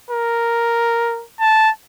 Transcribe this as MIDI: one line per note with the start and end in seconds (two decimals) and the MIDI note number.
0.10 1.23 70
1.40 1.70 81